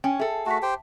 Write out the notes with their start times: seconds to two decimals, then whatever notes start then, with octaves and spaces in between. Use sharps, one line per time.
0.04 C#4 G5 G#5
0.19 G#4 A4 E5
0.46 A3 F#4 A5 B6
0.62 G4 C5 G5